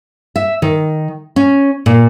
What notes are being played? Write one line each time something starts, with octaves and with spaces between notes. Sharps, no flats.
E5
D#3
C#4
A#2